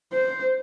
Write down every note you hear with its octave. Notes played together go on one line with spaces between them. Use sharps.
C5